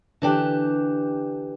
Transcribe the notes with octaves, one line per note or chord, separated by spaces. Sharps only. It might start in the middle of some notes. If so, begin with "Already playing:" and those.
D3 E3 D4 G4 G5